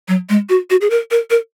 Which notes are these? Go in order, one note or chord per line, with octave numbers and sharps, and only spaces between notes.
F#3
G#3
F#4
F#4
G#4
A#4
A#4
A#4